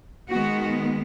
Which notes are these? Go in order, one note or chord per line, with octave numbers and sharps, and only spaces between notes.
D#3 G#3 B3 F#4